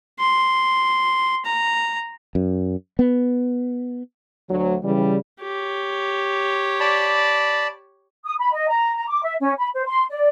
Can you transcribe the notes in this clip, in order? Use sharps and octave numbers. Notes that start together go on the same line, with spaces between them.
C6
A#5
F#2
B3
D2 F#3
C#3 E3 G3
G4 C#5
D5 A5 B5
D#6
B5
D#5
A#5
A#5
D6
E5
C#4
B5
C5
C6
D5